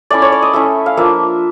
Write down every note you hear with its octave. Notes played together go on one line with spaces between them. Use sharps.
A3 C#4 E4 D5
C#5
D5
D#5
A3 C#4 E4 E5
F5
F3 A#3 D4 E5